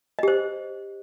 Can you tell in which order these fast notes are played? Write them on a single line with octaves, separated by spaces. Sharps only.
D#5 G4 C5